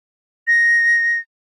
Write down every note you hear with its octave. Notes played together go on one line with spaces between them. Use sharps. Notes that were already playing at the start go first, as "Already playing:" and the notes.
A#6